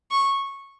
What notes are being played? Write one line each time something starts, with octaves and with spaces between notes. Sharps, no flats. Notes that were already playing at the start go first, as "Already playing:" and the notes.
C#6